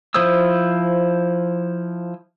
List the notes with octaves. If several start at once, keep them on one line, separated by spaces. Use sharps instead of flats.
F3 E4 C5 D#6 E6